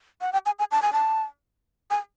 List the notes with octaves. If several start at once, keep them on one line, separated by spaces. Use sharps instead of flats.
F#5
G5
G#5
G#5
A5
G#5
A5
G#5